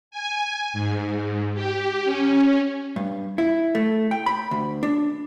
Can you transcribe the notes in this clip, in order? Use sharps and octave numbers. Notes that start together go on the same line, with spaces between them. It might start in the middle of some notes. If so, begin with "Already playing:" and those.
G#5
G#2
G4
C#4
G2
E4
A3
G5
B5
D2
D4